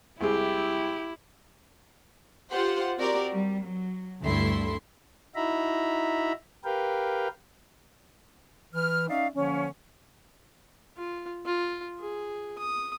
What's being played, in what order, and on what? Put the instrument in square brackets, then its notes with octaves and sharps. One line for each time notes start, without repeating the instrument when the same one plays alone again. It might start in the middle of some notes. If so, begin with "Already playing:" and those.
[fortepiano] C2 G#3 G#4 [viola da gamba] E4 [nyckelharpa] G4
[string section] F4 G4 C5 F#5
C4 F#4 G4 A#4 D5
G3
F#3
D2 G2 A3 E4 C6
[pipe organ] D#4 E4 F#4 E5 A#5 B5
G4 A#4 B4 F5 G5
[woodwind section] E3 B4 F6
C#4 D#4 D5 E5 F5
D3 F3 A#3 C#4
[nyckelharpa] F4
F4
G#4
D#6